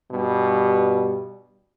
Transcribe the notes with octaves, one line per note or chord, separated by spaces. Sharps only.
G2 B2 G3